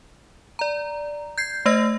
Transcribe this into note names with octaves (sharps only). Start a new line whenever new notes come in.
D5 A#5
G6 G#6 C7
A3 C5 D#5 E6 A#6